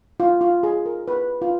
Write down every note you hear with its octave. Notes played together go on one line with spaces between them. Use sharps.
F4
F4
G#4
A#4
B4
F4